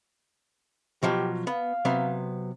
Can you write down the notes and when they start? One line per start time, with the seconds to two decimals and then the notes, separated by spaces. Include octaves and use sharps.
1.03 B2 F3 F#3 G4
1.47 B3 F5
1.85 C3 F#3 B3